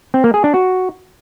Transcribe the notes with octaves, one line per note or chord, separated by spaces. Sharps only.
C4
A#3
G#4
D4
F#4